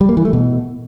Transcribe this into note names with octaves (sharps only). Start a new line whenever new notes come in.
G3
A#3
E3
A3
B2